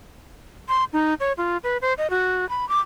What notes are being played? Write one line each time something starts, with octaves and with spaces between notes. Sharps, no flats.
C6
D#4
C#5
F4
B4
C5
D#5
F#4
B5
D6